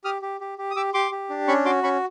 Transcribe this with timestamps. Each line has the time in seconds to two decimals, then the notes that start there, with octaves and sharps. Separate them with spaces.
0.04 G4 D#6 F6
0.22 G4
0.41 G4
0.58 G4
0.71 D#6
0.76 G4 D6 E6
0.94 G4 C6 D6
1.11 G4
1.30 D4
1.48 C#4 B5 C#6
1.65 F#4 C6 D6
1.83 C#4 B5 C#6